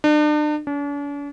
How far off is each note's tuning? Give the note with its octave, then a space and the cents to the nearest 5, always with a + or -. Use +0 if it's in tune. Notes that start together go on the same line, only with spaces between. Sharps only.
D4 +40
D4 -45